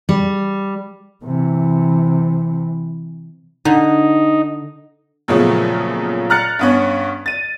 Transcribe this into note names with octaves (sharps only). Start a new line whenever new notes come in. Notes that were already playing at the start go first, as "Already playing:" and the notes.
G3
C3 E3
D3 D#4
F#2 A#2 C#3 F3 A3 B3
A#5 F6 F#6 A6 C#7
G2 B3 C#4
A6 D#7